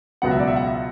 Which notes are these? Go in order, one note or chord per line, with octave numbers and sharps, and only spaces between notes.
C#2 B2 F#3 B3 F#5
E5
D5
E5
F#5
E5